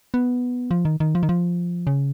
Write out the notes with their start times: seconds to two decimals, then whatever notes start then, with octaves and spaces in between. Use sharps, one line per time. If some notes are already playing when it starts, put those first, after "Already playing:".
0.14 B3
0.71 F3
0.85 D#3
1.00 D#3
1.15 F3
1.23 D#3
1.29 F3
1.87 C#3